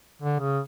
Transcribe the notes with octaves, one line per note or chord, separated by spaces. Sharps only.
D3
C#3